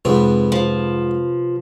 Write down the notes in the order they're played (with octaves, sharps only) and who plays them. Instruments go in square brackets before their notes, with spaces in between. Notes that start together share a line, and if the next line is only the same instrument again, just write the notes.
[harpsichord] F2 G#2 C4 [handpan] C3 B4
[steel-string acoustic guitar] F3